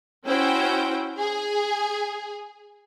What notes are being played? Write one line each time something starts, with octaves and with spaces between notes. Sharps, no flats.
C#4 E4 F#4 C5 G5
G#4